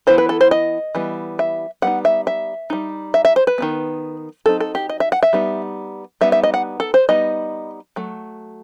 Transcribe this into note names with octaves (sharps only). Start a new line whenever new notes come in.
E3 B3 E4 C5
B4
A4
C5
D#5
E3 G3 B3
E5
G3 B3 D#4 F#5
E5
E5
G3 D#4
E5
E5
C5
B4
D#3 F#3 B3
F#3 C4 D#4 A4
A4
G4
D#5
E5
F#5
E5
G3 B3 D#4
G3 B3 D#4 E5
E5
D#5
F#5
A4
C5
G3 B3 D#4 D#5
F#3 A3